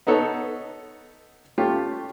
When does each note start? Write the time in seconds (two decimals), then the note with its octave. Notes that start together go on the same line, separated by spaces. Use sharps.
0.07 B3 D#4 A4 C#5
1.58 A3 C#4 F4 G4